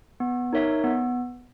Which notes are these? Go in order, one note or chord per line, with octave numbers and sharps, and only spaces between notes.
B3
D#4 A#4 C#5 E5
B3